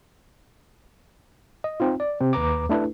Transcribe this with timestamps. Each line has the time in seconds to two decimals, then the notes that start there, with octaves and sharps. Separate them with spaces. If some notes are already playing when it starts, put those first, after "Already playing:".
1.64 D#5
1.80 C4 D#4 F4
2.00 D5
2.21 C3 C4
2.33 D#2 B4 A#5 D6
2.69 A3 D4 E4 A4 B4